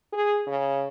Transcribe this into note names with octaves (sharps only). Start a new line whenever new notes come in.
G#4
C#3